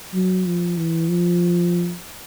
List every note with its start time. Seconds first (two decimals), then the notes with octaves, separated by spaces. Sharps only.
0.14 F#3
0.46 F3
0.77 E3
1.09 F3